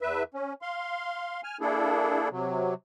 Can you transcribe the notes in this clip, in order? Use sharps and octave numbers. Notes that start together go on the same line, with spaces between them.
E2 B4 E5
C#4
F5 C6
G#5 F6
A#3 D4 E4 G#4 A4
C3 F#3